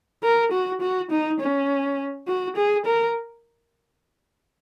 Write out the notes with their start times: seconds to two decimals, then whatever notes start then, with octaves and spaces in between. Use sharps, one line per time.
0.23 A#4
0.52 F#4
0.81 F#4
1.11 D#4
1.40 C#4
2.28 F#4
2.56 G#4
2.85 A#4